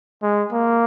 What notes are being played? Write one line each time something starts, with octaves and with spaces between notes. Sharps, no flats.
G#3
A#3